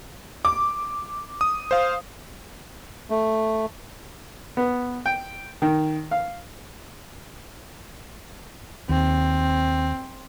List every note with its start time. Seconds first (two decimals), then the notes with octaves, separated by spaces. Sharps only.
0.45 D6
1.41 D#6
1.71 C5 F5
3.10 A3
4.57 B3
5.06 G5
5.62 D#3
6.11 F5
8.89 D#2 C4